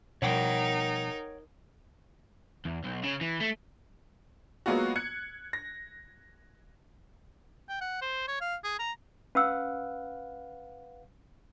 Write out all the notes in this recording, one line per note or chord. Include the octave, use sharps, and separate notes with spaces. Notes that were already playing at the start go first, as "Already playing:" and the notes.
B2 F3 G3 D#4 A#4 C#5 F#5 G5
E2
B1
C#3
E3
A3
F#3 G#3 A#3 B3 F4 F#4
F#6 G#6 C#7
A#6
G5
F#5
C5
C#5
F5
G#4
A#5
C#4 B4 F5 F#5 E6